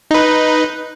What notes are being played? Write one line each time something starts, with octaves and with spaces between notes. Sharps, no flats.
D#4 B4